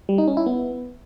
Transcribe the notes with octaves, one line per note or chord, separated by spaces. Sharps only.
G3
D#4
C#4
E4
B3